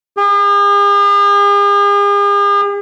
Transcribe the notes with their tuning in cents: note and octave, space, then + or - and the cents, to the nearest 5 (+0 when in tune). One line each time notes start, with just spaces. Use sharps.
G#4 -45